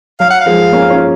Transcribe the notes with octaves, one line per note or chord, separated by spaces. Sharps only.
F#3 F5
F#5
F5
F3 G#3
A#3 C#4
C#4 F4